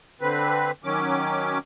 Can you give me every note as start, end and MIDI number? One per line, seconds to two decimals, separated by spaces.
0.21 0.71 50
0.21 0.71 60
0.21 0.71 71
0.84 1.58 51
0.84 1.58 54
0.84 1.58 61
0.84 1.58 86